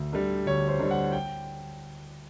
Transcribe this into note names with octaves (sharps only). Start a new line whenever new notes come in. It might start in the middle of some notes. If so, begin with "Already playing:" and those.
Already playing: D2
D3 G3
D2 C#5
C5
D3 G3
F#5
G5